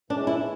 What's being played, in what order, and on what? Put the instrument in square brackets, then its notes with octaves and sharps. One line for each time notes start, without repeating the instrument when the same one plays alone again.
[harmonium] E3 G#3 C#4 [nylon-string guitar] D4
[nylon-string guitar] E4